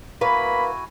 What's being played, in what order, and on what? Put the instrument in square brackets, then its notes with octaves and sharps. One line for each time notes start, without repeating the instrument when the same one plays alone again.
[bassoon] A#3 [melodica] E4 F#4 G#5 [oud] B4 [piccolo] B5